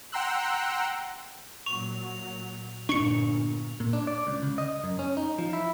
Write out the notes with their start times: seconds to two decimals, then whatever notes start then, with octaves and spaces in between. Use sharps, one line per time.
0.12 F#5 G5 A#5 C6 E6 F#6
1.66 A#2 F#3 C#6 F7
2.89 G1 A#2 D4 C#6 C#7
3.80 A#2
3.93 D4
4.07 D5
4.27 C#2
4.43 C#3
4.58 D#5
4.84 F#2
4.99 C#4
5.17 D#4
5.39 F3
5.53 E4